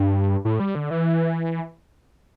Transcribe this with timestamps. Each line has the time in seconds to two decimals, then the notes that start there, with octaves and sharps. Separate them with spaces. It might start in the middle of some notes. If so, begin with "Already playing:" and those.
Already playing: G2
0.45 A2
0.60 G3
0.75 D3
0.91 E3